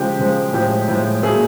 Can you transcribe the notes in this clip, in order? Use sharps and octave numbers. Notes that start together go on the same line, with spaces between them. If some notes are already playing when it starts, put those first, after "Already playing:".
Already playing: C#3 F3 G#3 G4
C#3 F3 G#3
A2 F3 G#3 G4
A2 F3 G#3
A#2 F#3 A3 G#4